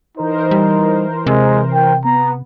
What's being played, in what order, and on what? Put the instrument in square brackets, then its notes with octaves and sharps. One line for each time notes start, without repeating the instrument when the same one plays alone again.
[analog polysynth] E3 A#4 C5 [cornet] D#4
[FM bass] G3
[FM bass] C3 [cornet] G#3
[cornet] G5
[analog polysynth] B3 [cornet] A#5